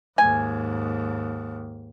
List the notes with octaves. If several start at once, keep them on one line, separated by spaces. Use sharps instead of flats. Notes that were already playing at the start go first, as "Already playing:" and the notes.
D#2 G#2 G#5